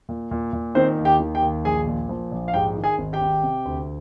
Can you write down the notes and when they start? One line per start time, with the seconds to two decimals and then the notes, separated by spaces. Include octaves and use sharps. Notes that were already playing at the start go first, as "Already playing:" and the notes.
0.09 A#2
0.31 A#2
0.53 A#2
0.75 D#3 C4 C5
0.99 D#2
1.05 G4 G5
1.20 D#3
1.35 G4 G5
1.43 D#2
1.65 A#1 G#4 G#5
1.87 A#2
2.09 F3
2.32 A#1
2.48 F5
2.54 G#2 G4 G5
2.76 D#3
2.84 G#4 G#5
2.98 G#1
3.13 G4 G5
3.21 G#1
3.43 C3
3.65 D2